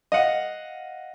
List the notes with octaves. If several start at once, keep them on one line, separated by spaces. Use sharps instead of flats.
D#5 F5 F#5